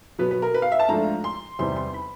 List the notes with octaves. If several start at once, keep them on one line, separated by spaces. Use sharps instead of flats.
B2 F#3 B3 B4
B4
A#4
B4
F5
E5
A5
G#2 F3 A3 D4 F4 A#5
C6
E2 C3 D#3 G3 C4 C6
C6
B5